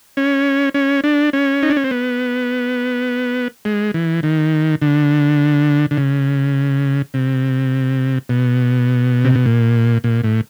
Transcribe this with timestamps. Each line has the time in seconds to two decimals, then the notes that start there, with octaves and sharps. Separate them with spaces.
0.17 C#4
0.74 C#4
1.04 D4
1.33 C#4
1.62 D#4
1.70 D4
1.76 C#4
1.84 C4
1.91 B3
3.65 G#3
3.94 E3
4.23 D#3
4.82 D3
5.91 D3
5.97 C#3
7.14 C3
8.29 B2
9.25 C3
9.35 B2
9.46 A#2
10.04 A#2
10.24 A2